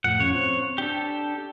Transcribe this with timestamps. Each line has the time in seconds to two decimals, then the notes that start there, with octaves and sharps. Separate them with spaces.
0.04 F2 A2 F#5
0.20 F3 C#4 C#5
0.35 C4
0.78 D4 G4 A4